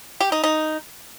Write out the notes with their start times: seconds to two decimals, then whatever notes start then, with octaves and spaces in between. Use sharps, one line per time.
0.20 G4
0.32 D#4
0.44 D#4